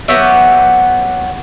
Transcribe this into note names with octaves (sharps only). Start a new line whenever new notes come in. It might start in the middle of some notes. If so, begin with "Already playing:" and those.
F#3 B3 G4 E5